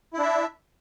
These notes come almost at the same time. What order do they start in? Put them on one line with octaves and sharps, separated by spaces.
E4 D4 E5